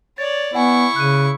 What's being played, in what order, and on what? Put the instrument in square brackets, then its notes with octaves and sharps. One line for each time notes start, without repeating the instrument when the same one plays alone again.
[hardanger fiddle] C#5 D5 [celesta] A6
[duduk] B3 [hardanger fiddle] E4 C#6 [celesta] D5 F#5 G#5
[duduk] C#3 [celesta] F#6 D#7